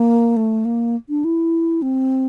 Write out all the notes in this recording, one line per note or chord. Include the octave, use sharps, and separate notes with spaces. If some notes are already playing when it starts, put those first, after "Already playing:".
Already playing: A#3
A3
A#3
D4
E4
C4